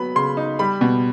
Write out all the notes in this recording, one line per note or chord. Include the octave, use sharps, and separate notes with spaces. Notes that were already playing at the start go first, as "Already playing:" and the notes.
Already playing: F#3 B3 B5
C#3 C6
D#4
G3 B5
B2